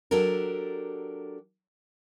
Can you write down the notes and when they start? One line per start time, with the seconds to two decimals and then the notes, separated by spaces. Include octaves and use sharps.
0.11 F#3 D4 G4 A4 A#4